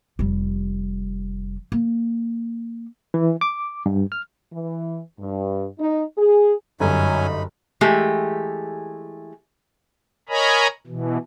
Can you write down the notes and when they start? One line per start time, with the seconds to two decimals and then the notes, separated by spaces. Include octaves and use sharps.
0.19 F1 G3
1.72 A#3
3.14 E3
3.41 D6
3.86 G2
4.12 F6
4.53 E3
5.20 G2
5.80 D#4
6.18 G#4
6.80 G1 F#2 F#3 C#4 D#4 G#5 B5
7.81 E3 G#3 A3 G4
10.29 A#4 C#5 D#5 G#5 A#5 B5
10.87 B2 E3